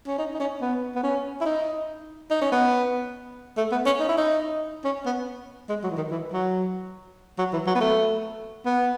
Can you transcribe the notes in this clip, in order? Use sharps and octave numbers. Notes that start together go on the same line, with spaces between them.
C#4
D#4
D#4
C#4
B3
B3
C#4
E4
D#4
D#4
C#4
B3
A3
B3
C#4
D#4
E4
D#4
C#4
B3
G#3
F#3
E3
D#3
E3
F#3
F#3
E3
F#3
B3
A3
B3